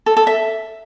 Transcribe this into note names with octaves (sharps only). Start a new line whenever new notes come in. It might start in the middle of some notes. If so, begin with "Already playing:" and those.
A4
A4
E5